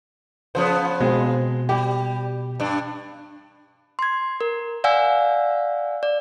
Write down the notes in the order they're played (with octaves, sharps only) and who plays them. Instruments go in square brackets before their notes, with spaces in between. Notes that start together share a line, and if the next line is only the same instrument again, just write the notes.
[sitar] C#3 F3 B3 [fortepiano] C5
[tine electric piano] B2 [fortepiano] G#3 C4
[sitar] G3 [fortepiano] G4
[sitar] G2 D4
[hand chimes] C6 G#6
A#4
D5 F5 F#5 G#5 E6
D5